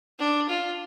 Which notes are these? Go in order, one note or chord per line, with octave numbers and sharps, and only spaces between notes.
D4
F4